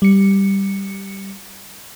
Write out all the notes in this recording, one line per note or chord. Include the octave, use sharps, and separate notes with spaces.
G3 C#7